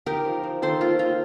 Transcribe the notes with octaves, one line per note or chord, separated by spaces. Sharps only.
D#4 G4 A#4
F3
F3
D#3 A4 C5
A#3 F4
A#3 F4